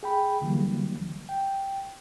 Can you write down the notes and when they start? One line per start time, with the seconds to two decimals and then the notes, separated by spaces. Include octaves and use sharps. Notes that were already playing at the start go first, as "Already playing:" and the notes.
0.03 G#4 G5 B5
0.41 D2 D3 E3 F#3 G3 A#3
1.29 G5